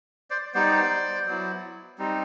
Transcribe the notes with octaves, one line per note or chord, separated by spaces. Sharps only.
C5 D5
G3 B3 D#4 C5 D5
F#3 B3 E4
G3 C4 D#4